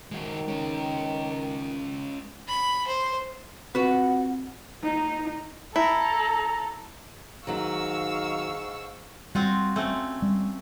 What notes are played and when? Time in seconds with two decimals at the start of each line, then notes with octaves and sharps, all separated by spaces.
0.11 D#3 G#3 F#4
0.48 G#3 C#4
2.48 B5
2.87 C5
3.75 C4 F4 F#4 B4 F#5
4.83 D#4
5.76 E4 A4 A#5
7.47 G#2 D#3 F#3 D#4 F5 C#6 E6
9.35 G3 C4 F4 F#4
9.76 A3 C4 C#4
10.22 G3